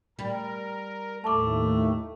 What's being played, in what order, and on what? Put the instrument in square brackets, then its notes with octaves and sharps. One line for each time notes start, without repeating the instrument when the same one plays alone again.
[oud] G3 [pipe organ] A#4
[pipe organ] D#2 A2 [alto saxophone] A3 [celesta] A5 D6